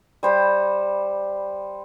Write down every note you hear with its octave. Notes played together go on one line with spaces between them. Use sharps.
G3 C5 B5